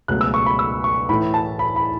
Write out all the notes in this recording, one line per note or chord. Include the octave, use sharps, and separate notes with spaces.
C#2 B2 F#3 A3 F#6
E6
C#6
B5
E6
C#6
A2 E3 A3 B5
A5
B5
B5